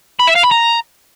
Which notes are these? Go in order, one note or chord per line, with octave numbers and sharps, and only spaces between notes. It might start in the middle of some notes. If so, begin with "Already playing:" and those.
B5
E5
F5
B5
A#5